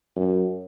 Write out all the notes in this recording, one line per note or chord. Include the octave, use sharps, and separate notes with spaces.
F#2